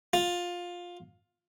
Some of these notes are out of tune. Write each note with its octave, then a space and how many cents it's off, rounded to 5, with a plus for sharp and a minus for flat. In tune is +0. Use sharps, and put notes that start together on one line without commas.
F4 +15